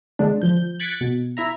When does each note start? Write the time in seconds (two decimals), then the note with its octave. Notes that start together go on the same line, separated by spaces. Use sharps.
0.19 D3 G#3 D4
0.42 F3 G6
0.79 F#6 G#6 A6 B6 C#7 D7
1.01 B2
1.37 E4 E5 A#5